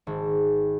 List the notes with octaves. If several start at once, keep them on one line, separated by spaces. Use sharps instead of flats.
G#1